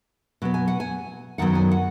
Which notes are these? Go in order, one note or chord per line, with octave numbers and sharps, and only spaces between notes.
B2 F#3 B3
G#5
F#5
G#5
F#2 D#3 F#3 B3 F#5
G#5
F#5